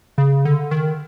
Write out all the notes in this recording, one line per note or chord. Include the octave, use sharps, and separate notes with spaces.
C#3
D3
D#3